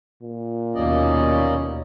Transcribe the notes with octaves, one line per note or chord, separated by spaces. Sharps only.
A#2
D#2 B2 A#3 C#4 D5 D#5